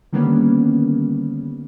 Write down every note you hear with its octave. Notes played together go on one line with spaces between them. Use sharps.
D3 D#3 G3 A#3 B3 C#4